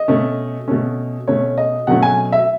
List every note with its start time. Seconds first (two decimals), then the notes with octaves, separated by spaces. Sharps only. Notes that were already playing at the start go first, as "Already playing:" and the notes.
Already playing: D#5
0.08 B2 A3 C#4
0.68 B2 A3 C#4
1.28 B2 A3 C#4 C#5
1.58 D#5
1.87 B2 F#3 A3 C#4 F#5
2.03 G#5
2.32 E5